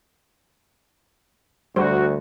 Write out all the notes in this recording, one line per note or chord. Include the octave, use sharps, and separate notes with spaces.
D2 G3 F#4 C5